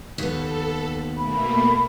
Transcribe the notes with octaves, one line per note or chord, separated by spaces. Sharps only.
D#2 B3 A4
B2 A3 A#3 B5